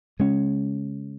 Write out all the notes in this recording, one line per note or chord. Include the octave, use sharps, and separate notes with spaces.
C#3 G#3 C#4